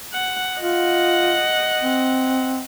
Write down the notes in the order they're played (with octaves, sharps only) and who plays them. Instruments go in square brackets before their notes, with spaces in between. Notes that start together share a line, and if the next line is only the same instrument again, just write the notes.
[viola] F#5
[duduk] F4 [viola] D#5 F#5
[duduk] C4